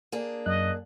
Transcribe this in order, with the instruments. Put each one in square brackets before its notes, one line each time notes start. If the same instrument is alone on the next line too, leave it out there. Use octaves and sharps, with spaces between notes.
[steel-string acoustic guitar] A#3 D4 G#4
[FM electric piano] F#2 F#6 [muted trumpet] D#5